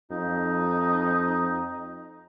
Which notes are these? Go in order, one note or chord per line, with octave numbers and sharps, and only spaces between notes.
F2 D#4